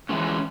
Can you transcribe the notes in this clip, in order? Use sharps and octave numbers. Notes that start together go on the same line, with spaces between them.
E3 G#3 C#4